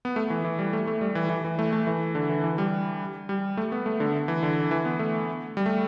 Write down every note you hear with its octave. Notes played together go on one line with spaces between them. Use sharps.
B3
A3
E3
E3
G3
A3
A3
G3
E3
E3
E3
A3
A3
E3
D3
E3
E3
G3
G3
A3
B3
A3
D3
E3
D3
E3
B3
A3
G3
A3